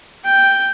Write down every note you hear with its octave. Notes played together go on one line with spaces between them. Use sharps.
G5